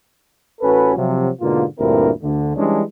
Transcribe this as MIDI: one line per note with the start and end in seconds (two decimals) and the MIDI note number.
0.61 0.92 33
0.61 0.92 61
0.61 0.92 66
0.61 0.92 69
0.61 0.92 71
0.95 1.29 48
0.95 1.29 53
0.95 1.29 54
1.40 1.64 44
1.40 1.64 47
1.40 1.64 50
1.40 1.64 58
1.40 1.64 65
1.80 2.10 38
1.80 2.10 43
1.80 2.10 46
1.80 2.10 60
1.80 2.10 64
1.80 2.10 70
2.23 2.56 38
2.23 2.56 50
2.23 2.56 57
2.57 2.81 52
2.57 2.81 55
2.57 2.81 56
2.57 2.81 61
2.57 2.81 62